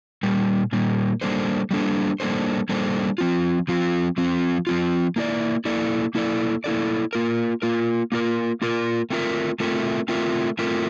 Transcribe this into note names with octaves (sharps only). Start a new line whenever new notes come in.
A#2 G3 A#3
A#2 G3 A#3
G3 A#3 D4 A4 C5
G3 A#3 D4 A4 C5
G3 A#3 D4 A4 C5
G3 A#3 D4 A4 C5
F3 C4 F4
F3 C4 F4
F3 C4 F4
F3 C4 F4
A#3 E4 A4 D5
A#3 E4 A4 D5
A#3 E4 A4 D5
A#3 E4 A4 D5
A#3 F4 A#4
A#3 F4 A#4
A#3 F4 A#4
A#3 F4 A#4
A3 C4 F4 A#4 E5
A3 C4 F4 A#4 E5
A3 C4 F4 A#4 E5
A3 C4 F4 A#4 E5